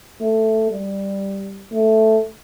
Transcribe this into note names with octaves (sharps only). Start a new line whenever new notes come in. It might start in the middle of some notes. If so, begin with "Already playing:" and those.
A3
G3
A3